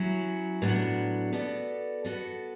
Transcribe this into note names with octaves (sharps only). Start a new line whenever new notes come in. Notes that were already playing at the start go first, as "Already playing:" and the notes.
Already playing: F#3 C#4 E4
A2 F#3 B3 D4 F#4
B3 F#4 A4 D5
B3 F#4 A4